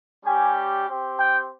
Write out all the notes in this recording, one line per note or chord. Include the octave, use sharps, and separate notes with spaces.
G3 C#4 G4 G#5
C4 G4
G5